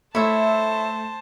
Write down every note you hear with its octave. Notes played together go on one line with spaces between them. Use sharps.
A3 E4 C5 C#5 E5 A5